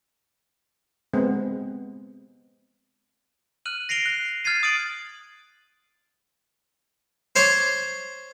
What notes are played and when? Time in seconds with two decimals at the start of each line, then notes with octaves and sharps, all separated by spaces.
1.13 G#3 B3 C4
3.65 F6 F#6 D#7 F#7
3.89 A#6 C7 D7 F7 G7
4.06 F#6
4.44 F6 G#6 A6 C7 D#7
4.63 D#6 A6 D7 D#7 F#7
7.36 C5 C#5 D6